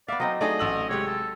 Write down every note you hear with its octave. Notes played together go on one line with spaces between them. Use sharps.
B3 D5 E5 F5
F#3 C4 D#4 D#5
A3 D4 D#4 G#4 D5 D#5
A1 E6 F#7
C3 G#3 G4 C#5
A4